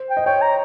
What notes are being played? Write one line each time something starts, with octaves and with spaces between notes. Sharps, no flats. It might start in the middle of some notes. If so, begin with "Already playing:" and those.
Already playing: C5
G5
D#5
C#5 G5
A#5